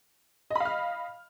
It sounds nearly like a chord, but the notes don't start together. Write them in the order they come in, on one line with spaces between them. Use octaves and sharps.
D#5 B5 F5 F6